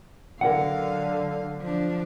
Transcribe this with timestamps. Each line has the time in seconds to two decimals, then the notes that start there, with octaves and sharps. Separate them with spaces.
0.41 D3 F#3 A#4 F5 F#5
1.61 F3 D4